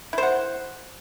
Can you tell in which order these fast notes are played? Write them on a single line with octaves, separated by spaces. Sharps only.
E4 C5 F#5